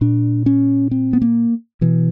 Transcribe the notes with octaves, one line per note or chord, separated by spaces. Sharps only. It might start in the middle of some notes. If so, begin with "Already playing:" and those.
A#2 D4
C#4
C4
B3
A#3
B2 E3